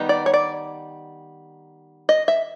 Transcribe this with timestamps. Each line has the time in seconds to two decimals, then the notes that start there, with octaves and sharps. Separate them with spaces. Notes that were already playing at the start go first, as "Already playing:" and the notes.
Already playing: D#3 G3 B3 D#4
0.09 D5
0.26 C#5
0.34 D5
2.09 D#5
2.28 E5